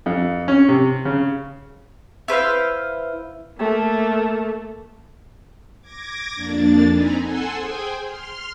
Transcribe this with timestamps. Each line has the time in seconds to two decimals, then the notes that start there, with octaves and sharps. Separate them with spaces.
0.06 F2
0.48 C#4
0.68 C3
1.05 C#3
2.28 E4 B4 C5 F5
3.58 A3 A#3
5.81 D6 G#6 A#6
6.35 F2 A#3 D4 A6
6.88 C4 D#4 G#5 A#5 B5
7.18 A4 F#5 G#5 C6 E6
7.52 G#4 C5 G5 G#5
8.02 C6 F6